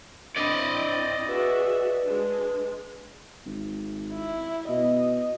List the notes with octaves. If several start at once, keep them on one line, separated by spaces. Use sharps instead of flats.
C4 D4 E4 D5 D#5 B5
F#4 G#4 B4 E5
G#3 D4
G#1
E4
B2 D#5